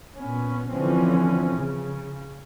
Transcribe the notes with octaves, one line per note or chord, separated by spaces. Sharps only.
A#2 B3 C#4
D3 E3 F3 C4 C#4
C#3